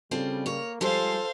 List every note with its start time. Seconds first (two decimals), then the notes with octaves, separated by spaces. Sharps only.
0.11 C#3 G3 C4 F4 A4
0.46 A#3 A#4 C#5
0.81 F3 G3 G#3 G4 A4 C5 F5